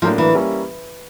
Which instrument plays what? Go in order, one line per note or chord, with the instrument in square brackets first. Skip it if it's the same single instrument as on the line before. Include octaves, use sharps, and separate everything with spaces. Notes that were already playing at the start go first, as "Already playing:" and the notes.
[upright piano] A2 F#3 A#3 D4 [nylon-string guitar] F3
[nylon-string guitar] E3
[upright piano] G3 A#3 C#4 E4